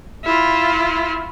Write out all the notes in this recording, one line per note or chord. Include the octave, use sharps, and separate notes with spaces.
E4 F4